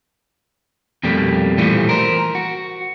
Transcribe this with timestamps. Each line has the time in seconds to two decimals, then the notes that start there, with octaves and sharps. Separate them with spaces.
1.03 F2 B2 G3 A3 A#3
1.58 A#2 E3 F3 G3 A3
1.89 A#4 C5
2.35 F#4